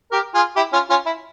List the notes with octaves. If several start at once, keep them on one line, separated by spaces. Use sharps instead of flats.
G4 A#4
F4 G#4
E4 G4
C#4 F4
C#4 F4
E4